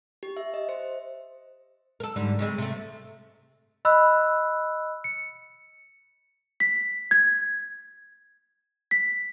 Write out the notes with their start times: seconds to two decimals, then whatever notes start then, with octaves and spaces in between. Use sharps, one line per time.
0.23 G4
0.37 E5
0.54 D#5
0.69 C5
2.00 A4 A#4
2.16 G#2 D3 G3
2.39 C#3 G#3 C4
2.58 C3 A3
3.85 D#5 B5 E6 F#6
5.04 C#7
6.60 B6
7.11 G#6
8.91 B6